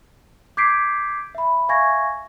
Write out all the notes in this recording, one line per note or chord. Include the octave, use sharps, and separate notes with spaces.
D6 G6 G#6 B6 C7 D7
E5 B5
E5 F5 G#5 C#6 G#6 A#6